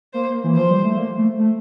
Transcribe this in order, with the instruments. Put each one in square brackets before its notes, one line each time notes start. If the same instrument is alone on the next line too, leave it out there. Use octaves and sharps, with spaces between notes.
[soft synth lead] A#3 [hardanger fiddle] C5
[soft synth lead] E3
[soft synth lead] F3 [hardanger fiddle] C5
[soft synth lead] G3
A3
A#3
A3
A3